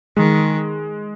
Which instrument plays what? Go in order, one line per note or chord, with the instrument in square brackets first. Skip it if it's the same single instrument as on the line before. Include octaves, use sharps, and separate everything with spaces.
[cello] D#3 [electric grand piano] G#3